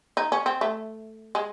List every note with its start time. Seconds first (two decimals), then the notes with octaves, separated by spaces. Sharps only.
0.17 D#4
0.32 C#4
0.46 C4
0.61 A3
1.35 G#3